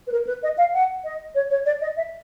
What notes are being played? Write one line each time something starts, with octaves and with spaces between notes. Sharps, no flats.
B4
A#4
B4
D#5
F5
F#5
D#5
C#5
C#5
D5
D#5
E5